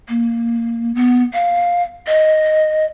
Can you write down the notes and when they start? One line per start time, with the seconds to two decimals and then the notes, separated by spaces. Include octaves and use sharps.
0.09 A#3
0.95 B3
1.33 F5
2.07 D#5